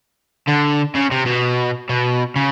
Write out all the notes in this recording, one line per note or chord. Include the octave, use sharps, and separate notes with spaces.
D3
C#3
C3
B2
B2
C#3